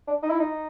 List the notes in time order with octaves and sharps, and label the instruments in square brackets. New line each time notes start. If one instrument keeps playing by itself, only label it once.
[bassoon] D4
D#4
E4
D#4